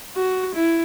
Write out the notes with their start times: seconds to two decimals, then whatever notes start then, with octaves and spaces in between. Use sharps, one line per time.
0.17 F#4
0.55 E4